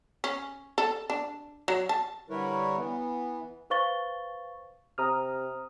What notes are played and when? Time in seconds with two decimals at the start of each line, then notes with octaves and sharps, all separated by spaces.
0.24 C#4
0.78 A4
1.10 D4
1.68 F#3
1.89 A5
2.30 D3 G3 E4 A#4 B4 C#5
2.77 E3 B3
3.70 B4 C5 F5 C#6 A6 G7
4.98 C3 A#5 D#6 F6